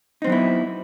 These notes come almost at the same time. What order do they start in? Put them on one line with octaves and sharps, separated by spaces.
D#4 C4 F#3 B3 E4